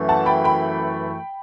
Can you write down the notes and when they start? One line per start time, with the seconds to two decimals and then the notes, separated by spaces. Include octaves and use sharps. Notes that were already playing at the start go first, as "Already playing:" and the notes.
Already playing: F#2 E3 A3
0.09 F#5 A5
0.26 G5 B5
0.44 G5 B5